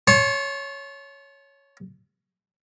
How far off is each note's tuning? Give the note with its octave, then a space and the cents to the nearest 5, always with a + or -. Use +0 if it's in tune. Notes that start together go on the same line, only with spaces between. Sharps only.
C#5 +0 A5 -30 C6 +35